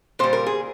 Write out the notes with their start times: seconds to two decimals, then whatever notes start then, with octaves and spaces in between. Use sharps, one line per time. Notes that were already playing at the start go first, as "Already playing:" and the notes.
0.19 A#2 G3 C5
0.33 A#4
0.46 G#4